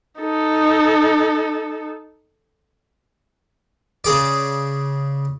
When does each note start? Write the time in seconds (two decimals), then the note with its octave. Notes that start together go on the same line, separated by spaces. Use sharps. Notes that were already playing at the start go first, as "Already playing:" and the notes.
0.19 D#4 A4
4.04 C#3 G#4 D5